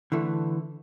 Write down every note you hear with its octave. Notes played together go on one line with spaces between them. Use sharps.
D3 E3 A3